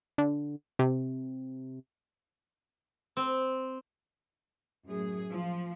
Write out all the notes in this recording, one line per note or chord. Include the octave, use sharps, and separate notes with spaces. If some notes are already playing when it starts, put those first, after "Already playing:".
D3
C3
C4
F#2 A2 G#4
F3